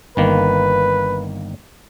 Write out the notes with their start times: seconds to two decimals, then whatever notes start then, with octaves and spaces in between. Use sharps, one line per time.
0.17 G1 D#3 A#3 B4